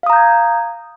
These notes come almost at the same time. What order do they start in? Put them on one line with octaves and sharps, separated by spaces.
F5 D#6 A#5 G6 G#6